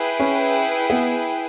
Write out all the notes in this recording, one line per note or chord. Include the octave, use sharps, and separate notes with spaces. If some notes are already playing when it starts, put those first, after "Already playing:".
Already playing: E4 G#4 B4 G5
C#4
B3